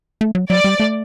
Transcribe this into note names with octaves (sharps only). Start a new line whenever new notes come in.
A3
F#3
F#3 D5
G3
A3